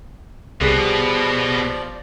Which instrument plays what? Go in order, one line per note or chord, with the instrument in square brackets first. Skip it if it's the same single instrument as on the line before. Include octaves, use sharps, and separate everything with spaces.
[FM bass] C2 [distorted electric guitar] B2 [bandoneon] F3 D5 [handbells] G4 G#4 F#6